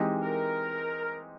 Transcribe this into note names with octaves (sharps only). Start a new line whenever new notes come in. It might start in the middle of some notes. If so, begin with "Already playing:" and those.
Already playing: E3 G#3 C4 D#4 G4
A#4